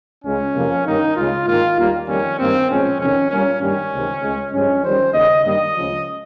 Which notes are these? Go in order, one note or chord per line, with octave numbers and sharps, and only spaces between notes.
C#2 C#3 G#3 C#4
F2 C3 F3 A#3
G2 D#3 A#3 D#4
C#2 C#3 G#3 F4
G#2 D#3 A#3 F4
D#2 D#3 G3 A#3
F2 D#3 G3 A#3 C#4
G2 D#3 A#3 C4
A#2 F3 G#3 C#4
F2 C3 D#3 C#4
A#2 G3 A#3 C#4
G2 D#3 G3 A#3 C#4
C#2 C3 D#3
C#2 C#3 G#3
G2 F3 G#3 C#4
F2 D#3 G3 C5
D#2 C#3 G3 D#5
G2 D#3 G3 A#3 D#5
C#2 C#3 F3